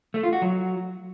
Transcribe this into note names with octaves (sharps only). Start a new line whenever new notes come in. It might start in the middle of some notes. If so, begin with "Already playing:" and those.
A3
F4
F#4
F#3